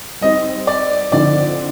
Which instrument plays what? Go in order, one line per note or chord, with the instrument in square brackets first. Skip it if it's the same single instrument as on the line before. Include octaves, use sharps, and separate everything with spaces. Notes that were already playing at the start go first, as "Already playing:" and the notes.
[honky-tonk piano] G3 C4 D#4 [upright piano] D#5
[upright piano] D5
[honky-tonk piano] D3 F3 C4 D#4 [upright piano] D5